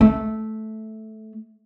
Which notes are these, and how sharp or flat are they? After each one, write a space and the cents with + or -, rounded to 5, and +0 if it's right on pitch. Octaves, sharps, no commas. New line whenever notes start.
A3 -10